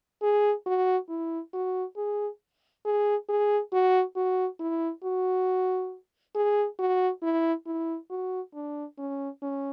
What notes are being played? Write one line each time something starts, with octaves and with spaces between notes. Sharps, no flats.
G#4
F#4
E4
F#4
G#4
G#4
G#4
F#4
F#4
E4
F#4
G#4
F#4
E4
E4
F#4
D4
C#4
C#4